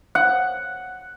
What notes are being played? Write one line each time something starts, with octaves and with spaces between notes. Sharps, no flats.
F#5